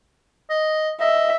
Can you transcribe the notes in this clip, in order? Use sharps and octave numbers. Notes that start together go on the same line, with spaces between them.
D#5
D#5 E5